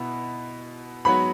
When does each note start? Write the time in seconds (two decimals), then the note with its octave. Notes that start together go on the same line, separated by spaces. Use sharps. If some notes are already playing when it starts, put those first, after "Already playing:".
Already playing: B2 B3 E4 B5
1.05 G#2 F#3 B3 F#4 C#5 B5